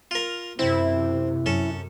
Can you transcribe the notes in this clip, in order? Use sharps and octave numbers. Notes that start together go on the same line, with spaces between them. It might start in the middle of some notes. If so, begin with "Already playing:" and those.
F4 A#4
F#2 C3 C4 E4
F#2 C#4 A4